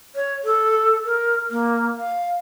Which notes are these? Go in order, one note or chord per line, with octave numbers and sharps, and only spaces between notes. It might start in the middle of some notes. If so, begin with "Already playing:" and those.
C#5
A4
A#4
A#3
F5